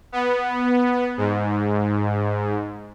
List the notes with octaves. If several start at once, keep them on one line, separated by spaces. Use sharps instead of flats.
B3
G#2